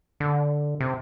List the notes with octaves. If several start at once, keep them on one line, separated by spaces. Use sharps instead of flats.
D3
C3